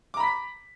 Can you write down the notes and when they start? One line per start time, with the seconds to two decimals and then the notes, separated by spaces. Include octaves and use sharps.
0.14 D6
0.17 A#5
0.20 B5
0.23 B6